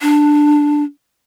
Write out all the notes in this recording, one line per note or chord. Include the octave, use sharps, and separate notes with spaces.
D4